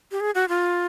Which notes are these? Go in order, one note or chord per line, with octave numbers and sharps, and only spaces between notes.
G4
G#4
F#4
F4